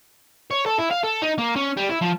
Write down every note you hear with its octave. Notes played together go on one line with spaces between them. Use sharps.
C#5
A4
E4
F5
A4
D#4
A#3
C#4
G3
E4
F3